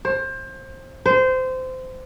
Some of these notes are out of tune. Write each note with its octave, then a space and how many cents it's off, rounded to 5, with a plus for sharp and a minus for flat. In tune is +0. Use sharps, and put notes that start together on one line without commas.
C5 +25
C5 -20